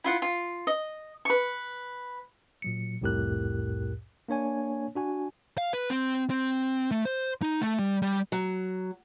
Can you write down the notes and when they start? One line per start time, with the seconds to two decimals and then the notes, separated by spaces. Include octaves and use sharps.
0.04 E4 F4 F#5
0.22 F4
0.67 D#5
1.25 B4 C#6
2.62 A#2 F#3 C#7
3.01 C2 F2 A2 G4 A#4 F#6
4.29 A#3 D4 C#5 G#5
4.95 D4 F#4 G#5
5.58 F5
5.73 B4
5.90 C4
6.30 C4
6.91 A3
7.05 C5
7.42 D#4
7.61 A3
7.79 G3
8.02 G3
8.32 F#3